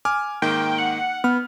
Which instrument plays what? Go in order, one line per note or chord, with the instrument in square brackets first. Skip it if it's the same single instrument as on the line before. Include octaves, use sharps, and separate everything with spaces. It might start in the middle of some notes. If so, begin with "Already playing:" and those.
[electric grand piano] G#5 D6 F6
[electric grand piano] G#2 D#3 A#3 [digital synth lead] G5
[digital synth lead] F#5
[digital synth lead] B3 [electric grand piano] F6